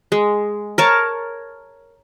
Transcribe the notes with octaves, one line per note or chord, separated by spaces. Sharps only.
G#3
A#4 C#5 A5